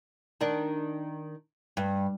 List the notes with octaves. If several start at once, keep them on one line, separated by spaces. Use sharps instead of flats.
D#3 D4
G2